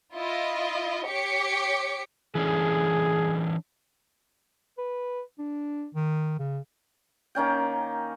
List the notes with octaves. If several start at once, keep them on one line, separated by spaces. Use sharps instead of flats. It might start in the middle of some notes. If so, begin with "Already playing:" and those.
E4 F4 D#5
G4 C#5 D6 B6 C#7
E3 C#4 D4 G#4
B4
D4
D#3
C#3
D#3 A#3 C#4 G5